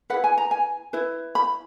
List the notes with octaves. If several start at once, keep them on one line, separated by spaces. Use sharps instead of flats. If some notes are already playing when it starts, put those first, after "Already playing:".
E4 G#4 B4 F#5
G#5
A#5
G#5
E4 B4
B5